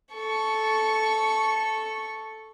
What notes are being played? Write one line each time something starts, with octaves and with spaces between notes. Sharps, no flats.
A4 C#6